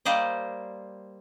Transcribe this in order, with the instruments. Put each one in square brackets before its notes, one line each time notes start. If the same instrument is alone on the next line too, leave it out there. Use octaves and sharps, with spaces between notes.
[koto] G3 A#3 C5 D5 D#5